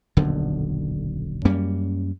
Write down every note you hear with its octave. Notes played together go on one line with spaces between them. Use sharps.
D#1 B1 F2 D3
F#2 G3 A#3 C#4